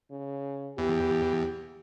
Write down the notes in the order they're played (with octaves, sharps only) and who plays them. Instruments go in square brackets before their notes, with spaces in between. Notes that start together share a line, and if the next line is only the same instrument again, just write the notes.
[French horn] C#3
[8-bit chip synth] E2 [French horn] G4